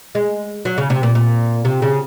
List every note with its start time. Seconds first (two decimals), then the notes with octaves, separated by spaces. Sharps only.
0.15 G#3
0.65 F#3
0.78 C#3
0.90 C3
1.03 A#2
1.15 A#2
1.65 C3
1.82 C#3